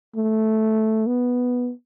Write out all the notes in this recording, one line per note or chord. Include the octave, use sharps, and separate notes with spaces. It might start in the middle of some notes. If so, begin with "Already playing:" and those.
A3
B3